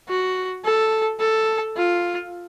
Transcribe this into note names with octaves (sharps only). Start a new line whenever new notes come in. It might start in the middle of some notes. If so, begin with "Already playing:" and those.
F#4
A4
A4
F4